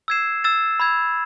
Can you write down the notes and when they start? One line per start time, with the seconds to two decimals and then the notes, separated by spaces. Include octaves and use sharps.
0.08 E6 G#6 C7 E7
0.44 E6 A6 E7
0.80 B5 E6 G#6